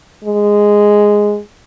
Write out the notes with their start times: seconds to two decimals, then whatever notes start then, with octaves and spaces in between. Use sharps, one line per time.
0.25 G#3